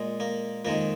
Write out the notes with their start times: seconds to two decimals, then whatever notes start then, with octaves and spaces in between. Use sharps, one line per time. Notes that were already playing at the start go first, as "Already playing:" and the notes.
Already playing: A#2 G#3
0.20 A#3
0.65 F2 D#3 G#3 A#3